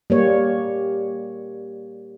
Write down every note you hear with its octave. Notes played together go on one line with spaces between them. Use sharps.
G3 A#3 C#5